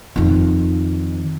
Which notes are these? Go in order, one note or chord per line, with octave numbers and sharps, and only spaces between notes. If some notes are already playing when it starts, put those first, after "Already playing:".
F2 D#3